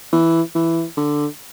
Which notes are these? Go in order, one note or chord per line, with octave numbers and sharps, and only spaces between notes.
E3
E3
D3